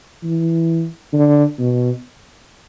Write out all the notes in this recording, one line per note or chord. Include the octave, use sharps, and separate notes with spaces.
E3
D3
B2